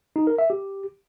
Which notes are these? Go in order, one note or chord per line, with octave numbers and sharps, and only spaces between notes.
D#4
A#4
E5
G4